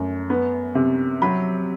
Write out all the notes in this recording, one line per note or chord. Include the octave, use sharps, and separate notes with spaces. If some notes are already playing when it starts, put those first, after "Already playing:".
Already playing: F#2 A3
B3
C3
F#3 B5